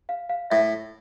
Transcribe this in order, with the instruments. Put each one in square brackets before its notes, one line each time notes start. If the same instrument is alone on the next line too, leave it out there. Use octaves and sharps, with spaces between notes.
[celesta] F5
F5
[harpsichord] A2 [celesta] E5